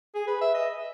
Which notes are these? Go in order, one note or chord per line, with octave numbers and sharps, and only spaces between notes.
G#4
B4
E5
D#5